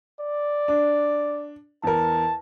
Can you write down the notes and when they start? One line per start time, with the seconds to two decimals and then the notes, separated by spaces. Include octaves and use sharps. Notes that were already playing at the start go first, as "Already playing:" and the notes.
0.20 D5
0.68 D4
1.84 E2 A#4 A5